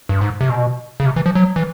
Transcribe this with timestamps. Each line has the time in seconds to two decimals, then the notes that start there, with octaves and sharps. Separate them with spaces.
0.09 G2
0.21 G#2
0.41 C3
0.49 B2
1.00 C#3
1.06 C3
1.16 E3
1.26 F3
1.35 F#3
1.56 E3